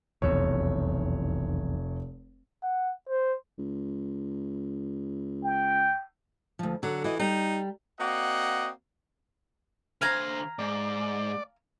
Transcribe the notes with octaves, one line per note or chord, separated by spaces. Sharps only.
F1 B1 E2 C#5
F#5
C5
C#2
G5
D2 F3
D3 F#3
E3 F#4 D#5
G3 D#4 A#5
A#3 C4 F#4 D5 D#5 F#5
D3 C5 F5 G#5 A#5
G#2 D5